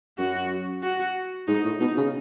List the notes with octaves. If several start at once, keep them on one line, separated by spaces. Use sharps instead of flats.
F#2 F#4
F#4
G#2 D#4
A2
B2 D#4
C#3